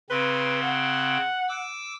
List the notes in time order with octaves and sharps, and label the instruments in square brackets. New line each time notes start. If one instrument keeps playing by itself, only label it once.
[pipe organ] C#3 C4 C6 [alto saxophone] B4
[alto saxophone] F#5
[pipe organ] D6 E6